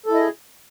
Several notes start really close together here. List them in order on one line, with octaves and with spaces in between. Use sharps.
A4 E4 D#5 G#4